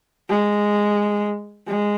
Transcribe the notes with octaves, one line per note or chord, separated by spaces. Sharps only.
G#3
G#3